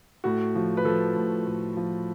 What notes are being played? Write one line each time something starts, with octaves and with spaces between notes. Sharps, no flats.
A2 F#4
F3
B4
F3 A4
A2
A2
F3